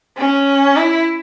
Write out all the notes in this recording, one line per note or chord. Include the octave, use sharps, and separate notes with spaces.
C#4
E4